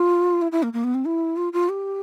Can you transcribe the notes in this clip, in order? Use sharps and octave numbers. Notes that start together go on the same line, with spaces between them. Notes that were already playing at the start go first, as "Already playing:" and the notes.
Already playing: F4
E4
E4
A#3
A#3
B3
C4
E4
F4
F4
G4